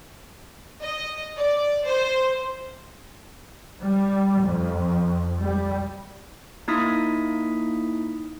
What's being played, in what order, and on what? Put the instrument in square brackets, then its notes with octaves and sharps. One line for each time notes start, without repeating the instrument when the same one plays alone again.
[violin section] D#5
D5
C5
[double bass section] G3
F2
G3
[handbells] A#3 D#4 E4 D#6 B6